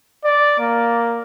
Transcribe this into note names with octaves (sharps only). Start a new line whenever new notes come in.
D5
A#3